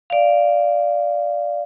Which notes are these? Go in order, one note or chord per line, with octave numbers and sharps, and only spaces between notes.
D5 F5